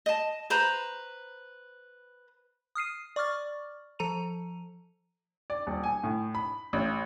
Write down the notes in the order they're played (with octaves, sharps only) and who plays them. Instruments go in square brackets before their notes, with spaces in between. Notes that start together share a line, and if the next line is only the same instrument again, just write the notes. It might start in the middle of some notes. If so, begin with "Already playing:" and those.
[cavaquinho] D#5 A5
B4 C5 A#5 B5
[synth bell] D#6 F6 C7 D#7
D5 C#6 D6 F6 A6
F3 A4 A#5 D#7 F7
[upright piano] D5
D#1
G#5
A2
B5
A1